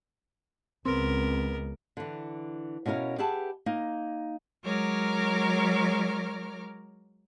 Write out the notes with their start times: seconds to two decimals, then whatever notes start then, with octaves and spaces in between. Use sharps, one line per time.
0.85 C#2 B3 C4 A#4
1.97 D3 E3
2.86 B2 C#4 E4 A#4 F5
3.18 G4 G#4 B4 E5 F#5 A5
3.66 A#3 D#4
4.62 F#3 G#3 A#4 C#5 D6 F6